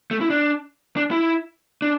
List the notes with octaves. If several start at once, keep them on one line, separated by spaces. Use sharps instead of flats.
A3
E4
D4
D4
E4
D4